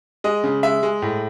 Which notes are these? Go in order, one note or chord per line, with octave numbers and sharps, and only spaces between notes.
G#3 D#5
C#3
G#3 E5
G#3
A2